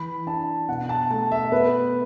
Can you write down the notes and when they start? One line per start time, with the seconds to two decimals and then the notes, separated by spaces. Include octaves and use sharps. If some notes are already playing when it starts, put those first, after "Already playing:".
Already playing: E3 B5
0.27 D4 A5
0.68 B2 F#5
0.89 A5
1.10 A3 A5
1.32 E5
1.52 B3 B4